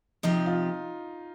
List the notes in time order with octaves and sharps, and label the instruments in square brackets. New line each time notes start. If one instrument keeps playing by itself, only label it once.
[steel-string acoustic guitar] C3 F3 C4 G4 [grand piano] D#4
[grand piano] F4